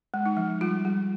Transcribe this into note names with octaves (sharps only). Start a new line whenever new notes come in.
G#3
D#4
F3
G3 F4
G3